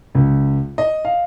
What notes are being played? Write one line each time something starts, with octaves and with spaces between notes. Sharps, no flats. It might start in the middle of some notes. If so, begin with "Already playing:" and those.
C#2
D#5
F5